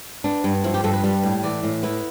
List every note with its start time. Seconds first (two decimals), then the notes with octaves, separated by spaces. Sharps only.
0.24 B3 D4
0.44 G2
0.64 F3 E4
0.74 G4
0.84 G2 A4
0.93 B4
1.04 G3
1.23 A2
1.43 E3 D5
1.63 A2
1.83 B3 E4